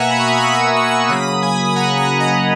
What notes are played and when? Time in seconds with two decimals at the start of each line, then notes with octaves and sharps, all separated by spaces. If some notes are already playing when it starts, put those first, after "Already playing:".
Already playing: B2 A#3 E5 F#5 G#5 A#5
0.10 G#5 B5
0.19 C#6
0.27 B5 D#6
0.43 C#6 E6
0.76 C#6 E6
1.09 C#3 F#3 A#3 B5 D#6
1.42 G#5 B5
1.65 G#5
1.76 F#5 A#5
1.97 F#5 A#5
2.20 D#5 F#5